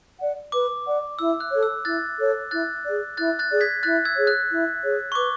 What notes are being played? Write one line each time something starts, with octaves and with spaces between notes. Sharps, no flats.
D5 F#5
B4 D6
D5 F#5
E4 E6
F#6
A4 C#5
E6
E4 F#6 A6
A4 C#5
E4 F#6 A6
G#4 D5
E4 F#6 A6
F#6 A6
G#4 D5
G#6 B6
E4 F#6 A6
E6 G#6
G#4 C#5
F#6
E4
G#4 C#5
C#6
B4 D6